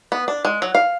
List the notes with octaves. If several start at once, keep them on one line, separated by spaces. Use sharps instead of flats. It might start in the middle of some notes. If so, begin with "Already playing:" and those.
B3
D4
G#3
F#3
F5